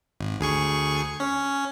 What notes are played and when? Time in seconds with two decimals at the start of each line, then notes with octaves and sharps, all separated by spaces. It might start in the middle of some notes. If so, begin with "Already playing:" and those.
0.20 G#1
0.40 D2 G#4 C#6
1.20 C#4